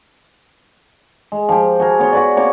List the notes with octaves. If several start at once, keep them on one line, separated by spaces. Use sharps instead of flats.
G#3
F3 G4
F#4 G#4 A#4
B3 C#5 C6
F#4 B4 D5
A#3 C4 C#5 D6